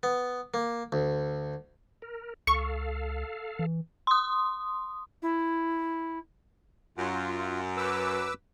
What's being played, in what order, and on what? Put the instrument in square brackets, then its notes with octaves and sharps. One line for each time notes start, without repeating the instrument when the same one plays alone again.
[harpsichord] B3
A#3
D2
[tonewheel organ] A#4
[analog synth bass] C#2 [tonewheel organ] A4 F5 [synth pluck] C#6
[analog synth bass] E3
[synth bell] C6 D#6
[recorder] E4
[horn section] F#2 [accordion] F4
[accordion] B4 D6 E6